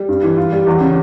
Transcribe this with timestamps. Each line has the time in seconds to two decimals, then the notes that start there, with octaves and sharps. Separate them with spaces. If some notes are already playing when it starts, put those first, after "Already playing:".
Already playing: G3
0.09 G2
0.23 E3
0.37 F4
0.52 G3
0.67 E2
0.81 C#3